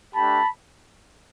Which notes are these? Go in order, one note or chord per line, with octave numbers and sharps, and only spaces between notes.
A3 D4 G4 A5 B5